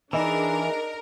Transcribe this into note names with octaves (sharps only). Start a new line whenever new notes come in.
E3 D4 D#4 G#4 A#4